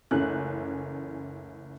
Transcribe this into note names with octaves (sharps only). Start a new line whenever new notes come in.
F#1 C#2 E3 A3 C#4 F#6